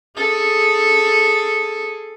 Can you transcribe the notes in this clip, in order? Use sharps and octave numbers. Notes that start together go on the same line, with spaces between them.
G#4 A4